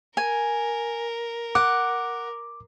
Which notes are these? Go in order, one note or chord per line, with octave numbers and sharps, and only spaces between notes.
A#4 G#5
F#5 D6